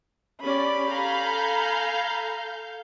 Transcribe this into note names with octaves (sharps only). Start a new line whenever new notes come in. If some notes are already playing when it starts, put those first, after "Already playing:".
C#4 G4 D5 B5
A4 F5 G#5 A#5 G6